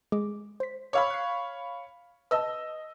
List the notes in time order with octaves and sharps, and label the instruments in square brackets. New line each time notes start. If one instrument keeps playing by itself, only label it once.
[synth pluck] G#3 G#4 D6
C5 B6
[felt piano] C#5 F5 B5 [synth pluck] D6 E6 F6
[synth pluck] F#6 C7
[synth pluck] B4 A5 [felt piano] D#5 E6